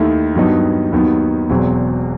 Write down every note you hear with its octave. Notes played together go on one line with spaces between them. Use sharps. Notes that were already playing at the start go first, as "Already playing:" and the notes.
Already playing: D#2 D#3 A3 E4
G2 D#3 F#3 B3 D#4
D#2 D#3 F#3 B3
E1 E2 B2 F#3 C4